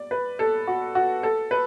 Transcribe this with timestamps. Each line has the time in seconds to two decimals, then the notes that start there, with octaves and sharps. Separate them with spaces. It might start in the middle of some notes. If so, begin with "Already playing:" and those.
Already playing: D5
0.11 B4
0.39 A4
0.67 F#4
0.95 F#4
1.23 A4
1.51 B4